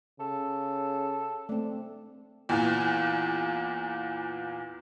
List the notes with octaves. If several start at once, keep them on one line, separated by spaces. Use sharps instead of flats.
C#3 A4
A3 C4 D4
E2 A#2 E3